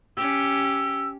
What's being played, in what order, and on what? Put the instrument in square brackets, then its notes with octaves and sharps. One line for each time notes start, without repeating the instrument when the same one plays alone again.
[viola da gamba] C#4 G4 [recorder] E6